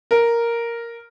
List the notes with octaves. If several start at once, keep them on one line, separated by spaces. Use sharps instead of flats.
A#4